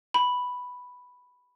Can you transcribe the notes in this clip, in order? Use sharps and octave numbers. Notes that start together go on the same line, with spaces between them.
B5